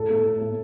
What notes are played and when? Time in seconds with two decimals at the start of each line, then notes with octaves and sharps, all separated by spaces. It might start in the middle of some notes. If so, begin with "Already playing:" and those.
Already playing: A2 A4
0.10 A3
0.25 A2
0.41 A3